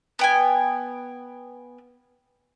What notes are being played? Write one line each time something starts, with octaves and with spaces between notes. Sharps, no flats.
B3 G5 G#5